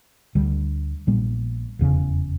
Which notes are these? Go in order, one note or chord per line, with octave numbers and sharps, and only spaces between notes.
D2 D3 G3
A#1 A#2 G3 B3
F1 E2 C#3